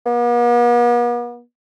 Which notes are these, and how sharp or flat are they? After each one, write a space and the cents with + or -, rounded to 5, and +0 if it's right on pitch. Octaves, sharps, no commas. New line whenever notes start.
B3 -45